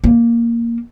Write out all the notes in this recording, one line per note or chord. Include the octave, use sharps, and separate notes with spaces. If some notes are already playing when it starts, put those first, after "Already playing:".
A#3